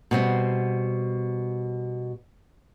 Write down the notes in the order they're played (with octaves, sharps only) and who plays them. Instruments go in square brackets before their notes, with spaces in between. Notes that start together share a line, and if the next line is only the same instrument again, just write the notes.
[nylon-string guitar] B2 G3 C4